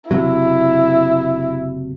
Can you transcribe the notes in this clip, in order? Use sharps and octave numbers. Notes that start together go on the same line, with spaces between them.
F#1 C3 F#3 E4